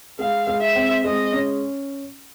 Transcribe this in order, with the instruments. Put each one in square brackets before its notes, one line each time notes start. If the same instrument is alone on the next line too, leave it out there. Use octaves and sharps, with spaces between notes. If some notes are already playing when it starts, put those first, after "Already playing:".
[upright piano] G#3 [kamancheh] F5
[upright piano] G#3
[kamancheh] E5
[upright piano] C4
[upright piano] G#3 [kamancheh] D#5
[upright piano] C#4